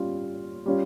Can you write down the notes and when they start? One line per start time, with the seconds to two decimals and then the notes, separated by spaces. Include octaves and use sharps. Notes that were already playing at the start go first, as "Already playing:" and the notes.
Already playing: G3 C#4 F4
0.66 G3 C#4 F4